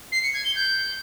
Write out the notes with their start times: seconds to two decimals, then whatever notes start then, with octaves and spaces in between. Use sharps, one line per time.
0.12 C7
0.23 C#7
0.34 G#6
0.45 G7
0.55 G6